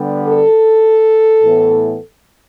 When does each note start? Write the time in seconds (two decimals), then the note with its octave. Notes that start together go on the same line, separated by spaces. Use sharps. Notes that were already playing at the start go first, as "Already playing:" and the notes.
Already playing: D3 G3 B3
0.28 A4
1.43 A2 E3 B3